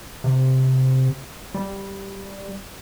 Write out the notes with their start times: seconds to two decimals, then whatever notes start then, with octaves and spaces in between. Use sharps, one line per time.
0.24 C3
1.54 G3